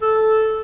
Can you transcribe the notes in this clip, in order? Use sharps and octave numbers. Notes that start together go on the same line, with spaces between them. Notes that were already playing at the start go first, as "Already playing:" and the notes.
A4